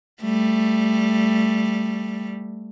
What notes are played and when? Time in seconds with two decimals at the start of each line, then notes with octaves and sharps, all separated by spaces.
0.22 G3 A3